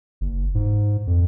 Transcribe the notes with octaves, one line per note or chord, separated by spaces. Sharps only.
F#1
G#2
F2